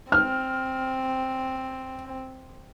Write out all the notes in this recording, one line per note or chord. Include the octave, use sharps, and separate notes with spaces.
C4 F6